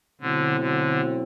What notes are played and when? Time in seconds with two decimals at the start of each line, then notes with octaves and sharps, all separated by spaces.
0.21 B2 D3 F#3 A3 C4 E4
0.60 D3